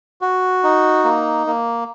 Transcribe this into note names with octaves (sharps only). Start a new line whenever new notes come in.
F#4
D#4
A#3
A#3